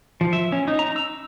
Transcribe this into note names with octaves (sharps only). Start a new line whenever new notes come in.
F3
E5
C#4
D#4
A#5
E6